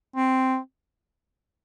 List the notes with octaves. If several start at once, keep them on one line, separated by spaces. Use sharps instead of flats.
C4